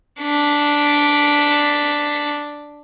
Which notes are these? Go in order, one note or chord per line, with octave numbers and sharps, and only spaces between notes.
D4 B6